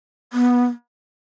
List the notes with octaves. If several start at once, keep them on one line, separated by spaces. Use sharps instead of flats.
B3